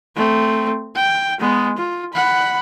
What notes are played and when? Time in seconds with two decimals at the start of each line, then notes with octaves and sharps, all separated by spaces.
0.16 A3 C4
0.95 G5
1.39 G#3 B3
1.77 F4
2.13 F#5 B5